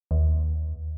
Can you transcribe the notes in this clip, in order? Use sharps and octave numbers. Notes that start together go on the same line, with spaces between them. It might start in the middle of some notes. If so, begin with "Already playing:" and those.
D#2